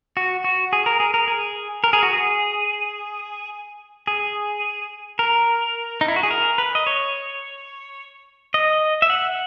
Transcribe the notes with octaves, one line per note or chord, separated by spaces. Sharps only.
F#4
F#4
G#4
A#4
G#4
A#4
G#4
A#4
G#4
F#4
G#4
G#4
A#4
D#4
E4
F#4
G#4
A#4
B4
D#5
C#5
D#5
E5
F#5